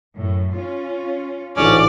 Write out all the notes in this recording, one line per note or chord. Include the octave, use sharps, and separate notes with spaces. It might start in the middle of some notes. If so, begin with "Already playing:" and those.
F#2 A2
C#4 F4
A1 D2 G#2 C#4 D5